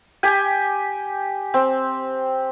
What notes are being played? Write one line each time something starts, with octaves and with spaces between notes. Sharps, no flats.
G4 G5 G#5
C4